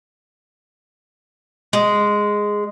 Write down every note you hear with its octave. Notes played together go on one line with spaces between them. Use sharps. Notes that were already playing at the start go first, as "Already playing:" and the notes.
G#3